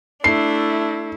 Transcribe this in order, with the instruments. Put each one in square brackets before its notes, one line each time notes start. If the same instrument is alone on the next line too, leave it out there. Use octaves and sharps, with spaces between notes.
[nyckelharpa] A3 [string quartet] D4 [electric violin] E4 [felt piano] C7